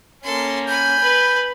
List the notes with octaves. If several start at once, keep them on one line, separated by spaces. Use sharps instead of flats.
A#3 C#4 A4 C6
G#5 B5 G6
B4